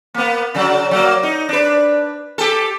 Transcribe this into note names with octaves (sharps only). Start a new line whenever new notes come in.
A#3 B3
C#3 F#3
F#3 A#3
D#4
D4 B4
G4 A4